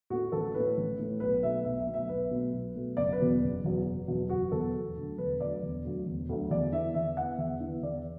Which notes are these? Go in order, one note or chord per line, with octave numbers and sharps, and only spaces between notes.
A2 A3 F#4
A1 A4
A2 A3 B4
A1
A2 A3
B1 B4
B2 F#3 A3 E5
B1 E5
E5
B2 F#3 A3
E5
B1 B4
B2 F#3 A3
B1
B2 F#3 A3
F#1 D5
B4
E2 B2 F#3 B3
F#1
E2 B2 F#3 B3
F#1
E2 B2 F#3 B3
F#1 F#4
E2 B2 F#3 B3 A4
E1
D2 D3 F#3
E1 B4
D2 D3 F#3 D5
E1
D2 D3 F#3
E1
D2 D3 F#3
E2 D5
E3 B3 E5
E2 E5
E3 B3 F#5
E2 E5
E3 B3
E2 D5